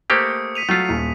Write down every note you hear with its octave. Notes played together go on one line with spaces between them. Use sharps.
A3 A#3 G4 C5 D#6 C#7
B6 D#7 F7
F#3 A3 F4
D#1